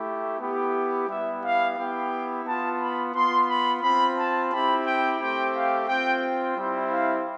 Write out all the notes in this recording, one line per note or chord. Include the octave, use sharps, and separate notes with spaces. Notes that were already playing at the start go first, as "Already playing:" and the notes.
Already playing: A3 E4 G4
B3 E4 G4
G3 B3 E4 E5
F5
B3 E4 G4 G5
B3 F4 A5
B5
B3 F4 C6
B5
C4 F4 B5
A5
C4 E4 G4 B5
G5
A3 C4 G4 G5
F5
C4 F4 G5
G3 C4 E4
F5